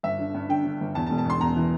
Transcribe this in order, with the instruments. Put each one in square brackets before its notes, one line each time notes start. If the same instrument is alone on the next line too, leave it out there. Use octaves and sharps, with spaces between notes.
[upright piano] G1 E5
D3
G2
D3 G5
D3
G1
E2 A5
A5
E1
A5
E2 C6
E2 A#5
E3